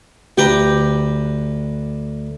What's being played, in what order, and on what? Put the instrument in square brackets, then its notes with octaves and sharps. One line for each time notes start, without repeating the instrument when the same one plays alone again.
[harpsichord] D2 B4 A#5 [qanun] G4 G5